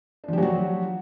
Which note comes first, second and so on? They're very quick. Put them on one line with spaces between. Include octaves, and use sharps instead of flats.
D4 F3 G4 F#3 F#4